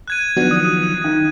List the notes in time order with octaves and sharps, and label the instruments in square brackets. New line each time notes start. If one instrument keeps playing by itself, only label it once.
[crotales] F#6 G#6 D#7
[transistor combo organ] D#3 F3 F#3 [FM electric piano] B3 D4 F#4
[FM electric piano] D#6
[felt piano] D#3